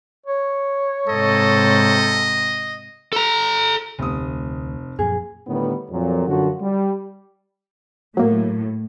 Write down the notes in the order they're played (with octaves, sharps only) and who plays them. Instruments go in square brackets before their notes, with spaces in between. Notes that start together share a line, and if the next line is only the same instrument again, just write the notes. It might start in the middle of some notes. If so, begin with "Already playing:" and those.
[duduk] C#5
[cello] G#2 C3 [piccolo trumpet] A4 [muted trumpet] D#5
[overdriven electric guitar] A4 A#5
[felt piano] F1 D#6 [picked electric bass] D2
[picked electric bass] F#2 A#2 F3 [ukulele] G#4
[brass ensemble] A2 D3 D#3 G3 B3
F2 A#2 F#3
F#2 D3 F3 F#4
G3
[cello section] A2 [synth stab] F#3 A#3